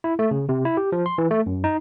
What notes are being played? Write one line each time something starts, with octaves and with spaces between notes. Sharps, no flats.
E4
A3
C#3
C3
E4
G4
F3
C6
E3
A3
F#2
D#4